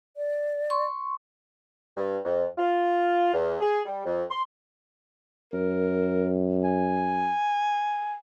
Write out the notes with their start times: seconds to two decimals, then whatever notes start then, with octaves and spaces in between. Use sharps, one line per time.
0.17 D5
0.70 C6 C#6
1.97 G2
2.25 F2
2.58 F4
3.34 E2
3.61 G#4
3.86 G3
4.06 F2
4.30 C6
5.53 F#2 A#4
6.64 G#5